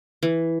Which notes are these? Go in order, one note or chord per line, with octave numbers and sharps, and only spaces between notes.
E3